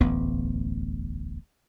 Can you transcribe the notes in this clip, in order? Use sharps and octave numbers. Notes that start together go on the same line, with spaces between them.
D1 A1 E2 B3